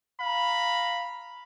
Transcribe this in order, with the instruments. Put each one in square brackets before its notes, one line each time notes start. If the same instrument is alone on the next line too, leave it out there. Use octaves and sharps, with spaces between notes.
[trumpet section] F5 A#5 B5